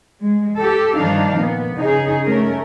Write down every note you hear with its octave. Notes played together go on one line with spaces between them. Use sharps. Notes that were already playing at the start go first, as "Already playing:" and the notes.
G#3
G4 A4
G2 D#3 F3 D4 D#4 F5
A#2 B3
C#3 D#4 G#4
A3 C#4 A#4